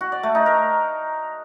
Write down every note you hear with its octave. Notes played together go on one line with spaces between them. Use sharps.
F#4
D5
A3
D#4
A#4